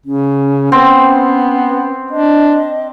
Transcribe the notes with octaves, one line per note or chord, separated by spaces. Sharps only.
C#3 C#4
B3 C4
D4 D#5